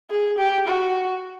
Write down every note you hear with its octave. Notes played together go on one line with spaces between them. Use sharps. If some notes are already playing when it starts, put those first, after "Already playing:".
G#4
G4
F#4